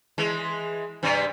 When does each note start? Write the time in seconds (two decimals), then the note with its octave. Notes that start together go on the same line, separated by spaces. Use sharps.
0.18 E3 G#3
1.03 G2 C3 G3